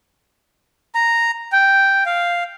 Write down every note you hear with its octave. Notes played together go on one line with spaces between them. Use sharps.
A#5
G5
F5